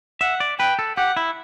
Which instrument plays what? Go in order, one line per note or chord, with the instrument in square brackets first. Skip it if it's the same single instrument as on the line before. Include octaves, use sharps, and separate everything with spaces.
[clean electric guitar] E5 [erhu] F#5
[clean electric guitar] D5
[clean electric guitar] B4 [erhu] G5
[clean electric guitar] A4
[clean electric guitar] G4 [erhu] F#5
[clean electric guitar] E4